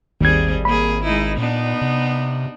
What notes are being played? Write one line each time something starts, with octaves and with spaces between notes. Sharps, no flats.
G#1 D#2 G3 C4 G#4 G#6
A#3 G#4 B5
G#3 D#4 E4
A#2 B3 D4 D#4
C3